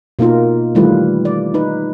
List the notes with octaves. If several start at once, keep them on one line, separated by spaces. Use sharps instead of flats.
B2 A#3 D#4 F4 A#4
D#3 E3 G3 A3 F4 B4
D5
D#4 B4